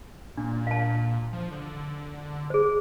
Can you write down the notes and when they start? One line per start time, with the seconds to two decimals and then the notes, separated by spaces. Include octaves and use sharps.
0.37 A#2 D4
0.67 F5 A5
1.33 F3
1.51 D3
2.50 G#4 C5